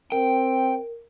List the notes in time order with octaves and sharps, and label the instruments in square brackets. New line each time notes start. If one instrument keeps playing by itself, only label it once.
[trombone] C4 [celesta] A#4 [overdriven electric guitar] G5